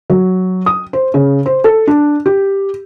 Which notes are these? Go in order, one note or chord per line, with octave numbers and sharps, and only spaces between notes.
F#3
D#6
C5
C#3
C5
A4
D4
G4